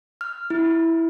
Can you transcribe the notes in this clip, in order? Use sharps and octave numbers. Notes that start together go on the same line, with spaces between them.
F6
E4